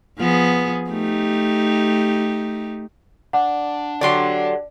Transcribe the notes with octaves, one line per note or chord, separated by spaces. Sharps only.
F3 B3 G#4
A3 D#4 G4
D4 F#5
D3 F#3 G4 D5 C6